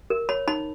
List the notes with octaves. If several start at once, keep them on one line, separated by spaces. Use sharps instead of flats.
A#4
C#5 B5
D#4 B5